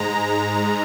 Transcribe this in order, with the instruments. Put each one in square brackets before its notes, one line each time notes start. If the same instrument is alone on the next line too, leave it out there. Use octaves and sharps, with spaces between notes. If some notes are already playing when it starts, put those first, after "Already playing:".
Already playing: [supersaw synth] G#2 G#3 A#5